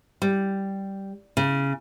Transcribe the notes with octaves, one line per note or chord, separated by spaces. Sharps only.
G3
C#3